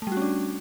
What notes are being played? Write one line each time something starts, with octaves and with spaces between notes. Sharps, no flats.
G3 A3 C#4 D4 F#4